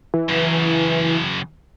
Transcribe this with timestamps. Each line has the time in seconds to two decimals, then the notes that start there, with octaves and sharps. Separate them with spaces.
0.14 E3
0.29 F#2 C#3